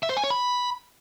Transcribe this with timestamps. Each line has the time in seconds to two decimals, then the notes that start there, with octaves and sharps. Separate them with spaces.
0.03 E5
0.10 C5
0.17 G#5
0.24 C#5
0.30 B5